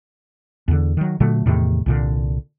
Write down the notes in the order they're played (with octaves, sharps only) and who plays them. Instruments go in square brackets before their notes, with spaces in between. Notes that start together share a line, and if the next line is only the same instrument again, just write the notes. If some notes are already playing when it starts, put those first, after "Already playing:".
[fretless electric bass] E2 D3
D#3 F#3
A#2 D3 F#3 A3
E2 A2 C3 D#3
C2 A#2 D3